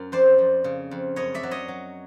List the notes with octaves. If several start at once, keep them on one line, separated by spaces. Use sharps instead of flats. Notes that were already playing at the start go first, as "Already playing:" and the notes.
Already playing: F#2 A#4
F2 C5 D5
F2
C#3
F2
F#2 C#5 D#5
D5 E5
F#3
C#5 D#5
F#3